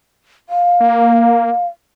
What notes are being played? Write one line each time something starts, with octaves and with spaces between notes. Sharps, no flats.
F5
A#3